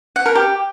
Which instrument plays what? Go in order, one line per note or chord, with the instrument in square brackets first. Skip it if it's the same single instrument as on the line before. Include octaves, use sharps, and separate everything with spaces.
[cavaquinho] F#5
A#4
G4